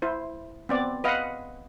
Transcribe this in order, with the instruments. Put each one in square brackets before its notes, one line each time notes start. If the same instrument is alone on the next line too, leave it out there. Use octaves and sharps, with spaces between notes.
[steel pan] E4 C5
B3 C4 D5
B4 D#5 F5 F#5